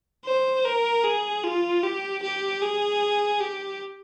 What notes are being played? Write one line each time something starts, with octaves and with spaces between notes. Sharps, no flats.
C5
A#4
G#4
F4
G4
G4
G#4
G4